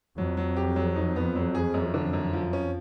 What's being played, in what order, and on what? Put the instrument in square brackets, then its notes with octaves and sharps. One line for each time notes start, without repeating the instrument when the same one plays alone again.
[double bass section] F2 [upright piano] F#3
[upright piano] F#3
G4
F#3
D#4
B3
F#3
G#4
F#2
D3
F#2
F3
C#4